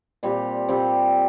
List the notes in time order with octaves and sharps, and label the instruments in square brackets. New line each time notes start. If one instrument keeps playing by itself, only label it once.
[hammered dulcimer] A#2 G3 C4 G4
A#2 G3 C4 G4